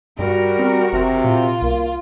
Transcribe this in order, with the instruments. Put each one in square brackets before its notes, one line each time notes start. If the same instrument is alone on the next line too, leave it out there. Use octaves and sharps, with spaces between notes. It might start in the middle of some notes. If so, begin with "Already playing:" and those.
[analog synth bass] G2 [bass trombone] G3 [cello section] F#4 A#4
[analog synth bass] C4
[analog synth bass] F#1 [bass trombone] C3
[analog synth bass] A#2 [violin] F4
[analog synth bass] C2 [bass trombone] A#3